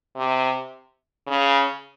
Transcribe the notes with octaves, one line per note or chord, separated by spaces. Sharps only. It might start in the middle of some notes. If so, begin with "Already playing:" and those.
C3
C#3